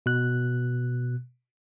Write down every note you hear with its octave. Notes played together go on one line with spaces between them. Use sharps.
B2 F#6